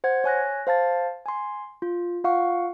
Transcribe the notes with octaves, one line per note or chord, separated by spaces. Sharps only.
C5 F#5 G#6
C#5 G#5 F#6 A#6
C5 F5 A5 A6
G#5 C6
F4
F4 F5 F#5 C#6